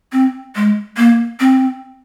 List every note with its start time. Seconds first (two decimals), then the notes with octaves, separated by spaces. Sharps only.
0.12 C4
0.56 G#3
0.97 A#3
1.40 C4